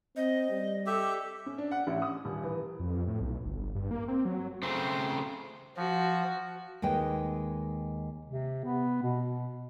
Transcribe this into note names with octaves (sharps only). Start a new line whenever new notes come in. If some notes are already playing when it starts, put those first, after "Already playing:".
C4 D#5
G3
G4 A4 E5
C#4
D4
F#5
A1
D#6
D#1
E3
F2
A2
B1
G1
G2
A#3
C4
F#3
C#3 A3 C4 C5
F3 F#4
D#2 G#3 B4 G5
C3
B3
B2